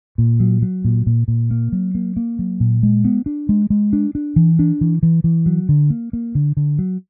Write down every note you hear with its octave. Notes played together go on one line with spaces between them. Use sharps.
A#2
F#3
F#3
A#2
A#2
A#2
A#3
F#3
A#3
A#3
F#3
A#2
G#3
B3
D4
G#3
G#3
D4
D4
E3
D4
E3
E3
E3
F#3
D3
A#3
A#3
D3
D3
F#3